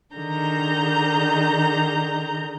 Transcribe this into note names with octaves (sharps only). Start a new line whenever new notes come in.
D3 D#3 G#4 A#5 G6